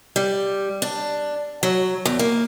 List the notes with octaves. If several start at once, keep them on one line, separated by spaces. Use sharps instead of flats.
G3
D4
F#3
E2
A#3